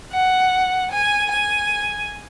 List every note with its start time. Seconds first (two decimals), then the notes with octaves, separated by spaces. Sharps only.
0.12 F#5
0.91 G#5
1.31 G#5